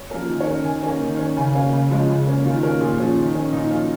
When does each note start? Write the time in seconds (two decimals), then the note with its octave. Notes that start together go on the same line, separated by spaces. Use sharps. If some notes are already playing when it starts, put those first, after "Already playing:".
Already playing: C#5
0.11 F3 A#3 C#4 A#4
0.29 D#3
0.41 C#5
0.47 C#4 A#4
0.65 D#3 G#5
0.83 A#3 C#4 G#5
1.01 D#3
1.19 C#4
1.37 C#3 G#5
1.55 A#3 C#4 F5
1.73 C#3
1.91 F3 G#3 C#4
2.09 C#3
2.27 A#3 C#4
2.45 D#3 F4
2.63 A#3 C#4 A#4
2.81 A#2 G#4
2.98 F3 C#4
3.17 D#3
3.35 C#4
3.53 A#2 D#4
3.70 F3 C#4 F4